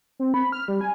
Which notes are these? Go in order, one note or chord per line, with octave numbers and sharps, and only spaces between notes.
C4
B5
F6
G3
G#5